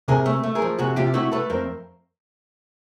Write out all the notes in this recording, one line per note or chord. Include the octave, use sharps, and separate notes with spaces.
C3 G#4 A#4
A3
A3
G#4 A#4
F3
C3 F#4 G#4
C3 F4 G4
A3 E4 F#4
A3 A4 B4
F2 A#4 C5